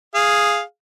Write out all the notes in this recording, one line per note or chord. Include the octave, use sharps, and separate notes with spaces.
G#4 F5